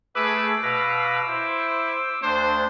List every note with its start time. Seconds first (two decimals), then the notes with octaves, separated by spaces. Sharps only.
0.16 A3 G#4 B4 D6 E6
0.63 B2 B4 F5 A#6
1.28 E4 C5
2.23 D2 D4 C5